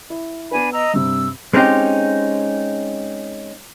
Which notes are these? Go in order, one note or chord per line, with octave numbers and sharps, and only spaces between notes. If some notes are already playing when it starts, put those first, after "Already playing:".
E4
B3 D4 B4 G#5 B5
D#5 A#5 E6
G2 C3 E6
G#3 C4 C#4 D#4 G4